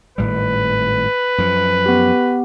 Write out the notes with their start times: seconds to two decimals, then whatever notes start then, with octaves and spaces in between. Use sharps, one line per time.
0.18 G#1 A2 G3 B4
1.38 F#2 F3
1.86 B3 G4